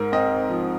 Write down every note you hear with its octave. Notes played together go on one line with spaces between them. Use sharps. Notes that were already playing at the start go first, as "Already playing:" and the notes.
Already playing: G#2 A#4
C4 D#5
F3